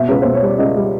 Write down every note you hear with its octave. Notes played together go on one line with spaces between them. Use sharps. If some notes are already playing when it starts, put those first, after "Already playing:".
Already playing: B2 E5
C#2 B4
B2 C5
C#5
G3 D5
C#2 D#5
G3